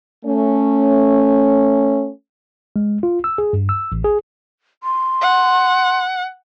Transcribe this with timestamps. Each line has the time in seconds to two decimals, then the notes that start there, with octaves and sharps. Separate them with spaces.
0.25 A3 C#4
2.76 G#3
3.03 F4
3.24 E6
3.38 G#4
3.53 G2
3.69 E6
3.92 A1
4.04 G#4
4.83 C6
5.22 F#5